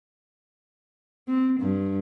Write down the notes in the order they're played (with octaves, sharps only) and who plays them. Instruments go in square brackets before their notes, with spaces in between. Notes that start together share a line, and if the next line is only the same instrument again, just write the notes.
[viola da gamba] C4
G2